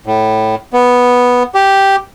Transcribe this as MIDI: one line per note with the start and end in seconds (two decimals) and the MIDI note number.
0.06 0.55 45
0.73 1.43 59
1.55 1.96 67